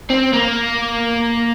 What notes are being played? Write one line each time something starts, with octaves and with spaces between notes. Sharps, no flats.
C4
A#3